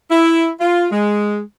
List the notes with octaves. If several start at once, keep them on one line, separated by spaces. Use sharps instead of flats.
E4
F4
G#3